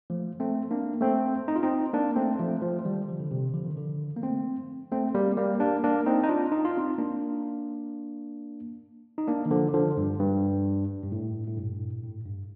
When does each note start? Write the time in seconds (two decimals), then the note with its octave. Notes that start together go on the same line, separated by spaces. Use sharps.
0.10 F3 A3
0.40 A3 C4
0.71 A#3 D4
1.01 A3 C4
1.48 D#4
1.55 F4
1.63 C4 D#4
1.93 A#3 D4
2.16 A3 C4
2.39 F3 A3
2.62 F3 A3
2.85 D#3 G3
3.08 D3 F3
3.20 D3
3.31 C3 D#3
3.54 D3 F3
3.66 D#3
3.77 D3 F3
4.17 A#3
4.22 A3 C4
4.92 A3 C4
5.15 G3 A#3
5.37 G3 A#3
5.60 A#3 D4
5.84 A#3 D4
6.06 C4 D#4
6.23 D#4
6.29 D4 F4
6.52 D#4
6.65 F4
6.77 C4 D#4
6.98 A#3 D4
9.18 D#4
9.28 A#3 D4
9.46 D#3
9.51 D3 F3
9.74 D3 F3
9.97 G2
10.19 G2
11.03 G2
11.12 A2
11.47 A2
11.57 G2 A#2
12.04 A2
12.26 G2